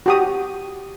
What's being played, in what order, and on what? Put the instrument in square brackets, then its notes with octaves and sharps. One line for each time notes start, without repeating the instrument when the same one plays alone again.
[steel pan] F#4 G4 D#6